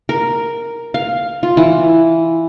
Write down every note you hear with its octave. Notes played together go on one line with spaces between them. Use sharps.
A#4
F5
F4
E3